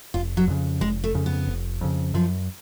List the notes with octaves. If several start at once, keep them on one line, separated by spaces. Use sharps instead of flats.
F1 F4
F#3
F2 C#3
F1 G#3
A3
F2 C#3
B3
F1
F2 C#3
F#2 F3